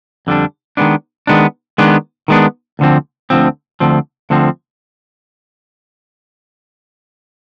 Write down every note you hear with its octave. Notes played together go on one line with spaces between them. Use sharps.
F2 D3 G3 D4
D#3 G#3 B3 D4
D#3 G#3 B3 D4
D#3 G#3 B3 D4
D#3 G#3 B3 D4
D2 D3 F3 C4
D2 D3 F3 C4
D2 D3 F3 C4
D2 D3 F3 C4